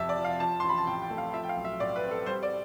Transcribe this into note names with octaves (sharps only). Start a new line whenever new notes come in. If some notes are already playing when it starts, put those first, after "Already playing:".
Already playing: F1 F2 C3 E5 A5
D5
F3
F5
F3 A5
A1 C6
B5
A5
A2 G5
G5
A3
F5
F3 E5
G5
F5
B1
E5
A2 D5
B4
C4
A4
G3 C5
D5